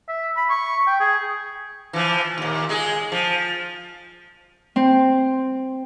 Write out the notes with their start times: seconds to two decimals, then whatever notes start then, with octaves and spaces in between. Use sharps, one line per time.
0.09 E5
0.37 B5
0.50 C#6
0.87 G5
1.00 G#4
1.93 E3 F3
2.38 D#2 A#2
2.69 G#3 G#4
3.12 F3
4.76 C4